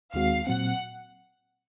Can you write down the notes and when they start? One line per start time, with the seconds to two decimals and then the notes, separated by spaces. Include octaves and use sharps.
0.13 D#2 D#3 G#3 C4 F#4 F5
0.47 A#2 F#3 C4 F#5